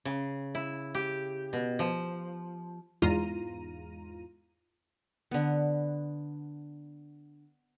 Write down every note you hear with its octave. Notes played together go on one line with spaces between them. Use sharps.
C#3
E4
G4
B2
F3
E2 G#2 F4 A#5 D#7
D3 B3